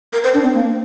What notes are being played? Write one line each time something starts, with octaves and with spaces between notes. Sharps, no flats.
A#4
C5
D4
C4
A#3